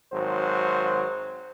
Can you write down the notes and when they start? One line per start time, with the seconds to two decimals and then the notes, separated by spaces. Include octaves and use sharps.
0.12 G#1 F#3 C5